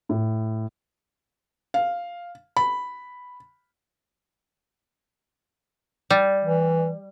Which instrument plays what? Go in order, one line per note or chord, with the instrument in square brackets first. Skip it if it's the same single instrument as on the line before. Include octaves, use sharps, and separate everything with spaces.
[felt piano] A2
F5
B5
[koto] G3
[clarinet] E3